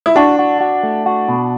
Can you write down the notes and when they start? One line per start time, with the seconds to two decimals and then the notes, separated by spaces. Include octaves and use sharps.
0.06 E4
0.15 D4 F#4
0.39 F#4
0.61 F#4
0.83 A3
1.06 F#4
1.29 B2